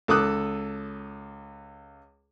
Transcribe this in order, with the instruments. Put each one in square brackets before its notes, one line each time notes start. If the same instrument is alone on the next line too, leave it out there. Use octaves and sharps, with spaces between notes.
[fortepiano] C#2 A4 D6 D#6 F#6